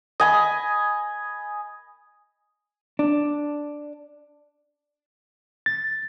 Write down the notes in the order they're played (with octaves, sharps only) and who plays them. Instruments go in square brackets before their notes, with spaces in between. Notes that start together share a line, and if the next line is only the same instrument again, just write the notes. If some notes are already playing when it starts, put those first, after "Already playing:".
[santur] D#5 G#5 B5
[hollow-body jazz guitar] D4
[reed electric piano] A6